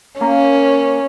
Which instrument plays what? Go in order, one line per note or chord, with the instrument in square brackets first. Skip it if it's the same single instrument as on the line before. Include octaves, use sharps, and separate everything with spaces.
[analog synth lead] A#3 [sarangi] C#4